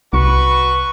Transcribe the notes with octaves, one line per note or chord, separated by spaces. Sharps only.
C2 F#4 B4 C#6